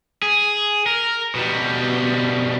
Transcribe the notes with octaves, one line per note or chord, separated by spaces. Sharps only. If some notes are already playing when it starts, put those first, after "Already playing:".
G#4
A#4
B2 G3